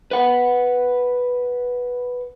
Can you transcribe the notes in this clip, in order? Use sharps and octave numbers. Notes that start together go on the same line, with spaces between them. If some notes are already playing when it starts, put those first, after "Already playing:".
B4 F#5